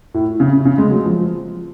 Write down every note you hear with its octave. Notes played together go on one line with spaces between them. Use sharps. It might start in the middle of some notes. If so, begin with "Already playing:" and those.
A2
C#3
C#3
G#3
F#3
F3